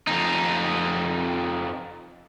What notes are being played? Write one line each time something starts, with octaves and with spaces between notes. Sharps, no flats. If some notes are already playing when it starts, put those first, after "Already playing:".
F2 D#4